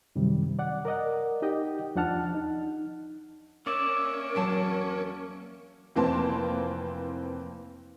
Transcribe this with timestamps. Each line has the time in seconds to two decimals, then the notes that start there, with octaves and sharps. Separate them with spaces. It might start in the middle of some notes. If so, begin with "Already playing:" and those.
0.16 F#2 C3 D#3 G3
0.59 D5 F#5
0.85 A#4 D5 D#5 F#5
1.42 D#4 G4 D#5 G5
1.95 E2 F3 D4 F#5 A5 F6
2.34 D#4
3.66 A#3 C#4 A#4 D5 E5
4.35 E2 F#3 A5
5.96 F1 E3 A#3 C4 A5 C6